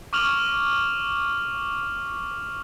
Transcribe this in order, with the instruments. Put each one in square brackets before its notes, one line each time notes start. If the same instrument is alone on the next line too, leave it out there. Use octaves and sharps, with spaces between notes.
[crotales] C#6 D6 F6 F7 F#7